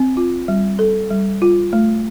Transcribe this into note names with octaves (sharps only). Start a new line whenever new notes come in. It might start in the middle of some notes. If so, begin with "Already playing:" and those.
Already playing: C4
F4
G3
A4
G3
F4
A3